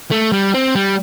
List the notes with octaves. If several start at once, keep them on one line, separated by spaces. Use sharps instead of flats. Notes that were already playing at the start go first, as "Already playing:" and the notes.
A3
G3
C4
G3